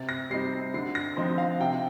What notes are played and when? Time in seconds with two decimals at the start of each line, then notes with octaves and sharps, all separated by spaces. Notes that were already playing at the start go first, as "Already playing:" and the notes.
Already playing: C3 A6
0.09 A#6
0.30 G3 C4 D#4 C7
0.74 D3 C7
0.95 A#6
1.17 F3 C4 D#4 C6
1.38 F5
1.60 C3 G5